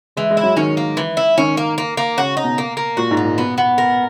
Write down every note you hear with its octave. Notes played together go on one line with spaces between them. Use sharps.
E3 G#3
G#3
E4
F#3
D#3 C#4
A#3
E3
E4
D#3 C#4
A#3
A#3
A#3
C#3 F#4
D#4
B2
A#3
A#3
A#2 F#4
G#2
D#4
A#2
B2 B3
B3
A#4